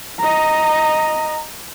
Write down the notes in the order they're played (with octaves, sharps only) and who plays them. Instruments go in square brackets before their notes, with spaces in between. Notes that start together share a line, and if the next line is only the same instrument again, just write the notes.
[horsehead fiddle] D#5 A#5